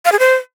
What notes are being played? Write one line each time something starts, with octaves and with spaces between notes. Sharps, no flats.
F5
G#4
C5